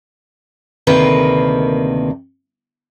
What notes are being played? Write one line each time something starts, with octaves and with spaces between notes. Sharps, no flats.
D2 C3 D#3 A#3 B4